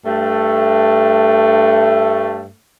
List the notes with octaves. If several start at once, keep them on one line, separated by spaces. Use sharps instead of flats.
G2 A3